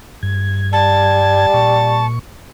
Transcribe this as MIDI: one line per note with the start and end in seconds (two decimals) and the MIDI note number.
0.23 1.46 43
0.23 1.46 92
0.73 2.08 55
0.73 2.06 81
1.54 2.19 46
1.54 2.19 85